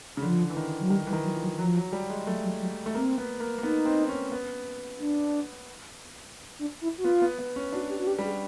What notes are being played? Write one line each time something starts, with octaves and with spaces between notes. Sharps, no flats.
C#3
D3 F3
E3
D#3
F#3
D#3 G3
E3 G3
D#3
F#3
F3
F#3
F3 F#3
F#3
G3
G#3
F#3 A3
F#3
F#3
A3
A#3 C4
B3
A#3
A#3
B3 D#4
C4
C#4
B3
D4
D4
E4
F#4
B3 F4
B3
B3
C#4
D4 F#4
G4
F#4
G4
G3
G#4